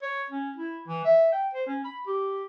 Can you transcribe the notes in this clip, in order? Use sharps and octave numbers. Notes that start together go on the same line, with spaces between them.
C#5
C#4
E4
E3
E5
G5
C5
C#4
B5
G4